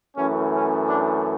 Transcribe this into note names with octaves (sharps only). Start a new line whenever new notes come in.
F#2 E3 A3 C#4
C#4
D4